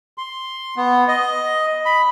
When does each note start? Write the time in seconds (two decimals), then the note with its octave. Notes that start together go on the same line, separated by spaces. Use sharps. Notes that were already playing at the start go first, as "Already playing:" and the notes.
0.18 C6
0.77 B3
1.08 D#5
1.86 B5